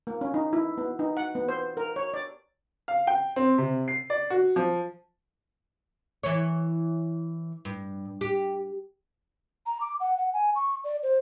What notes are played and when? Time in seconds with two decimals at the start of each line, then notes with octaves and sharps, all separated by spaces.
0.07 A#3
0.21 C#4
0.34 D#4
0.53 E4
0.78 B3
0.99 D#4
1.17 F#5
1.35 B3
1.48 C5
1.77 A#4
1.96 C#5
2.14 D5
2.88 F5
3.07 G5
3.36 C4
3.58 C3
3.88 C7
4.10 D5
4.30 F#4
4.56 F3
6.23 E3 C#5
7.65 G2
8.21 G4
9.66 A#5
9.81 D6
10.00 F#5
10.17 F#5
10.33 G#5
10.55 C#6
10.84 D5
11.03 C5